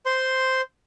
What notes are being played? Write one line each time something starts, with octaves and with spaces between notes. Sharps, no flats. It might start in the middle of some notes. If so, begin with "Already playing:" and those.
C5 C6